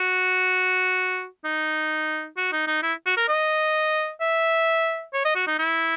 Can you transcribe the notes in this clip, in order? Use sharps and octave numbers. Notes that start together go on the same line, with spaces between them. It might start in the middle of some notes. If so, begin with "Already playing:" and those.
Already playing: F#4
D#4
F#4
D#4
D#4
E4
F#4
A#4
D#5
E5
C#5
D#5
F#4
D#4
E4